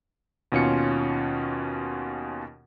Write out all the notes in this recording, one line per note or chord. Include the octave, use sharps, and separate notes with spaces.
D#2 B2 C#4 F4 C#7